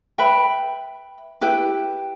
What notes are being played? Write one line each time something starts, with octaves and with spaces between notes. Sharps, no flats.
B4 E5 G5 B5
E4 G4 B4 G5